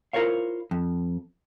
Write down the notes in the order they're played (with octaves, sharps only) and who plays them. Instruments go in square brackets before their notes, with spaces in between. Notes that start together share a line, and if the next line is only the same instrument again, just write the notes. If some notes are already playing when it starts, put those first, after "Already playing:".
[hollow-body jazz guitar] E4 F4 A#4 C5 C#5 F5
F2